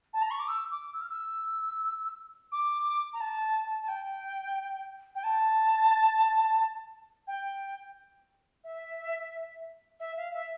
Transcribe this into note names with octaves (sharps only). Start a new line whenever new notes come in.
A5
A#5
C#6
D6
E6
D6
E6
F6
E6
D6
A#5
A5
A5
G5
G5
A5
G5
E5
E5
F5
E5